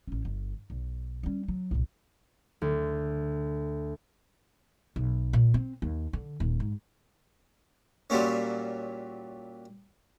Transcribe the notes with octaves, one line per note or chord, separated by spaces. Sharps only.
A1 C#4
G1
B1
G3 C#4
F#3
C2 A#2
D2
B1
A#2
C4
D#2
D3
D#1
G#2
A#2 F#3 G3 A#3 C#4